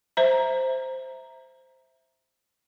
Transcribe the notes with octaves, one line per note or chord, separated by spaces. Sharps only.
C5 E5 A#5